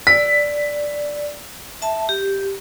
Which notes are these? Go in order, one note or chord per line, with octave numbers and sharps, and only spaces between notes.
D5 B6
E5 A5
G4